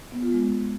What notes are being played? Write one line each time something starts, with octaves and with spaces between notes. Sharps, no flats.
B3
F4
G#3